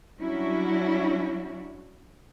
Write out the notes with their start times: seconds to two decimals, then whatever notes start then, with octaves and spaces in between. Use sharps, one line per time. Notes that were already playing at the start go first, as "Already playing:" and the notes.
0.20 F#3 G3 C#4 D4 E4 F#4